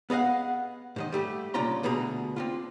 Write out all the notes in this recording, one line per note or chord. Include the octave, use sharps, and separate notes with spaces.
B3 G#4 D#5 F5 F#5
G#2 D#3 D#5
G3 A3 G4
A#2 C#3 D4 F4 A#5 C6
D2 B2 A3 G#4 A#5
C4 D4 F4